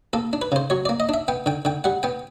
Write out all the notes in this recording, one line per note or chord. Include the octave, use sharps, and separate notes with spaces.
A#3 A4
D4
B4
C#3 C5
F#3 C#5
A#3 D5
D#5
D4 E5
B3 G5
D3 G5
D3 G5
G3 F#5
B3 G5